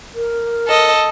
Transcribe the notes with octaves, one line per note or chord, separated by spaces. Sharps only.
A#4
A4 D#5